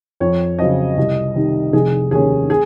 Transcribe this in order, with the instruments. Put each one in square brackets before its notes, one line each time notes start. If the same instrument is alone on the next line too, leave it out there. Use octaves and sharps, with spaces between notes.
[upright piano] F2 C#5
C#3 F#3 C4 D#5
C2
C3 D#3
F1 G#4
D#2 D#3 A#3 C#4 G#4
G#4